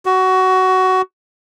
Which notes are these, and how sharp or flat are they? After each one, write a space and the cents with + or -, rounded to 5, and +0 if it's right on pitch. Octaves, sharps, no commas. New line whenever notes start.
F#4 +15